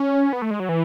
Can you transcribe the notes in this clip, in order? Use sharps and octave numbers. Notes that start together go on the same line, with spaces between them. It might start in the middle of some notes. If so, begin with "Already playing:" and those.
Already playing: C#4
B3
A3
G#3
F#3
E3